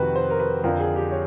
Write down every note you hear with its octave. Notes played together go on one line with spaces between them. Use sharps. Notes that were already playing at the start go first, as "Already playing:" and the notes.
Already playing: F2 C3 D#3 F#4 B4
C5
A#4
B4
F2 D3 F3 A#4
G#4
G4
C#5